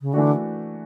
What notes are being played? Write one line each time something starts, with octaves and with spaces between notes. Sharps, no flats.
C#3
D3 E3 A3 D4 F#4